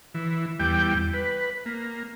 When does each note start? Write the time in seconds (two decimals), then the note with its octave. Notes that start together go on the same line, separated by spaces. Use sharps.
0.14 E3
0.60 E2 G3 G5
1.14 B4
1.66 A#3